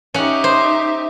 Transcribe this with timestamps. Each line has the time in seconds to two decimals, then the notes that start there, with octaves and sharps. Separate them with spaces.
0.14 C#4 D#4 G4 E5 F#5
0.44 C5